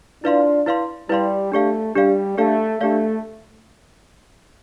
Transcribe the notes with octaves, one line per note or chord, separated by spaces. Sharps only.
D4 E4 F4 B4 D5 F5 C6
E4 B4 D5 F5 C6
G3 E4 B4 D5 F5 C6
A3 D4 G4 D5 F5
G3 D4 G4 D5 F5
A3 D4 G4 D5 F5
A3 D4 G4 D5 F5